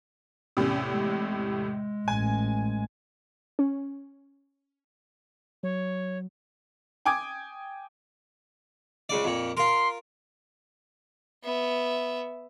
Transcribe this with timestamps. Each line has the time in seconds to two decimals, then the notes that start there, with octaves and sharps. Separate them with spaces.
0.57 E2 A2 C3 C#4
0.94 G#3
2.08 A1 G#5
3.59 C#4
5.63 F#3 C#5
7.05 G5 G#5 D6 D#6 G#6
9.09 C#2 C#3 D5
9.24 F2 A#2
9.57 F4 A#4 C6
11.44 B3 E5